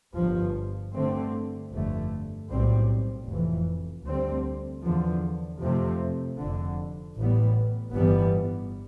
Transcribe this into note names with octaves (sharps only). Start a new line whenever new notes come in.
G1 G2 F3
G2 D3 A3 C4
G1 F2 D3 A3
B1 A2 G3 C4
F1 F2 E3
D2 D3 G3 C4
E2 D3 F3
F2 C3 F3 A3 C4
F1 F2 D3
A1 A2 G3 B3
G1 G2 E3 G3 B3